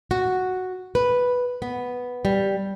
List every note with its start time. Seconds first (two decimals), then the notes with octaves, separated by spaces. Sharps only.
0.11 F#4
0.95 B4
1.62 B3
2.25 G3